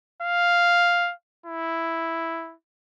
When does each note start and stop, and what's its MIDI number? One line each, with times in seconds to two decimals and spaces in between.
0.22 1.13 77
1.46 2.54 64